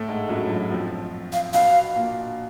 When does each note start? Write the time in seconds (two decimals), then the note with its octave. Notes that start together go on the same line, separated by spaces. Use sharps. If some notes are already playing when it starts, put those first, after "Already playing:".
Already playing: A2 A3
0.08 G#2 G#3
0.29 F#2 F#3
0.50 F#2 F#3
0.71 F2 F3
1.33 F5
1.54 B2 B3 F5
1.96 A#2 A#3